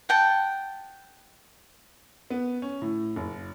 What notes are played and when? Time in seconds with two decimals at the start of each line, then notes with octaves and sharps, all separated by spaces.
0.09 F#5 G5 A5
2.30 B3
2.62 C#4
2.82 A2
3.16 F#1